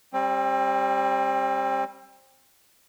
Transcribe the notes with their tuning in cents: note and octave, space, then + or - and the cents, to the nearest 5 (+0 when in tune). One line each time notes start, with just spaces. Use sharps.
G3 +0 C4 +30